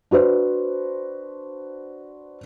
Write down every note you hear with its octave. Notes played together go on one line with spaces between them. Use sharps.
D4 F#4 B4 C5